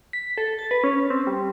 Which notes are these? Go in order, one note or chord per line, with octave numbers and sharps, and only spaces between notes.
B6
A4
A6
B4
C#4
C4
G3